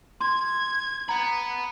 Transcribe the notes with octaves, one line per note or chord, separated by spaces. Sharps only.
C6 G#6
F#5 A#5 B5